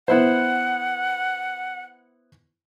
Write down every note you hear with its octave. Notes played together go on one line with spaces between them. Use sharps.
B3 E4 C5 F#5